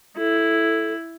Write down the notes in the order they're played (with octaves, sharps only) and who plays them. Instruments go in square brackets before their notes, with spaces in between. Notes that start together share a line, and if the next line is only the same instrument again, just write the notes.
[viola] E4 [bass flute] A4